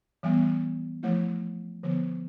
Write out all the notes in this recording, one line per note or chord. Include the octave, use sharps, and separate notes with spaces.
E3 G3 B3
F3 A3 E4
D3 F3 B3